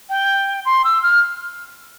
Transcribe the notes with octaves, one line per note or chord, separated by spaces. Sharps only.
G5
C6
E6
F6